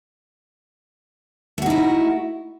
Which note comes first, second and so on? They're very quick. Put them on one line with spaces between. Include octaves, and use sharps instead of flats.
A3 F#4 D#4 E4